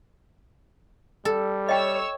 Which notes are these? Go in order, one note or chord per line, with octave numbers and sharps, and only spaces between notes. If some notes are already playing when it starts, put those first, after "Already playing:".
G3 A4
C#5 D#5 G5 E6